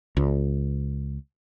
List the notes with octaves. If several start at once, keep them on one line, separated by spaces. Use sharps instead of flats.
C#2